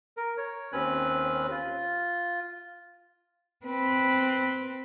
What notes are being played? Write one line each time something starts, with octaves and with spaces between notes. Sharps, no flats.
A#4
C#5
D#2 C4 C#4 B4 F#6
F4
C4 B4